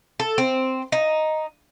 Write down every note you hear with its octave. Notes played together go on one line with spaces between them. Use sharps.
A4
C4
D#4